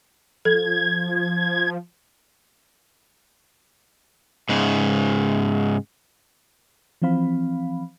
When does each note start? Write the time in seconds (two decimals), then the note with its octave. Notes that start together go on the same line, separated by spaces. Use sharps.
0.45 F3 A4 G#6
4.49 G#2 C#3
7.02 E3 F3 C4 F5 B5